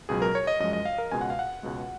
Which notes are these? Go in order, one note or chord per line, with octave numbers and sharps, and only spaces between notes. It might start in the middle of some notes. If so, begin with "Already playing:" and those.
C#2 B2 F#3 G#4
A#4
C#5
D#5
F#2 F3 G#3 D#5
D#5
F5
A#4
C#2 B2 G#3 G#5
F#5
F5
F#5
C#2 B2 G#3